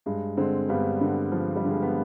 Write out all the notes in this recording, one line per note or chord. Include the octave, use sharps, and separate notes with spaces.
G2 G#3
D3 G#3 C4
G2 G3 B3
D3
F3
G3
D3 G#3
B3